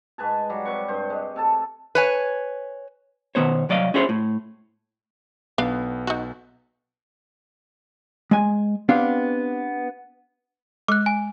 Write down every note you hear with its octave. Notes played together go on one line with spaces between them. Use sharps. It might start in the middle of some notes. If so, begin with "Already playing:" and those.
G#2 B4 G#5 A5
F#3 G3
C3 B4 C#6
G2 C5
G#3
C3 A4 A5
B4 C#5 G#5
B2 D#3 B3 C5 C#5
C2 F#3 D5 D#5 F5
C#4 E4 F#4 G#4 C5 C#5
A2
B1 B3 D4 F5
D#4 F#4
G#3 G#5
B3 C4 D4 G4 F5
G#3 D6 F#6
G#5